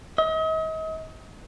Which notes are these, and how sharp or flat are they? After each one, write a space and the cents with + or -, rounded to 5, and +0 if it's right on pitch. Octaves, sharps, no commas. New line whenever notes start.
D#5 +40